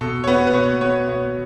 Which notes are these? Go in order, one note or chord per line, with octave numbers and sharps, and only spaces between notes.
B2 A4
C#5
B3 B4
B4
B2 C#5
B3 C#5
B2 C#5